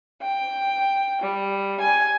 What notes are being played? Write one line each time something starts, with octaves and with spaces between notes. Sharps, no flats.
G5
G3
G#5